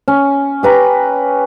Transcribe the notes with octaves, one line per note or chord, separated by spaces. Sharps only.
C#4
G4 B4 A#5